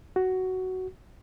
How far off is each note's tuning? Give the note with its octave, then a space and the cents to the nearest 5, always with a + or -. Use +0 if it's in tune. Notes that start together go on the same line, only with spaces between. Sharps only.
F#4 +10